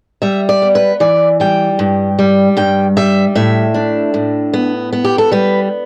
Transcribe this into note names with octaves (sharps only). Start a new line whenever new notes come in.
G3 E5
D5
B3
B4
E3 D5
G3 G5
G2
G3
G2 G5
G3 E5
A2 E5
D4
A2
B3
B3
G4
A4
G3 B4